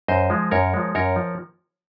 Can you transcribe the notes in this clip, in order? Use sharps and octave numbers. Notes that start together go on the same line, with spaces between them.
F#2 C5 D#5
F3 G#3
F#2 A#4 C#5
F3 G#3
F#2 A#4 C#5
F3